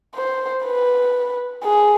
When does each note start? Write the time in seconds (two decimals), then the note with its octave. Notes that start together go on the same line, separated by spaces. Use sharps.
0.15 C5
0.65 B4
1.64 G#4